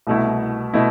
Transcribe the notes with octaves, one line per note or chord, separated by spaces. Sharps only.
C2 B2 A3 E4
B2 A3 E4